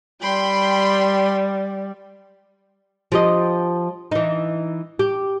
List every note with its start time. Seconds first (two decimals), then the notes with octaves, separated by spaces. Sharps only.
0.23 G3 G5 B5 C6
3.12 F3 G4 D#5
4.11 E3 D#4
4.99 G4